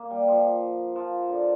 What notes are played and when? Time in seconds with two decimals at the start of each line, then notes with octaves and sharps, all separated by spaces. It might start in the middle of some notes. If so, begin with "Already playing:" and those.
Already playing: A#3
0.11 G3
0.28 F3
0.96 F3
1.30 D3